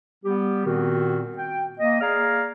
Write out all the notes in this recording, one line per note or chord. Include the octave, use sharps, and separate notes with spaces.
G3 B3 G4
A#2 D#3 B3 C4 F#4
G5
A#3 D#5
A#3 G#4 D5 F5 A#5 F6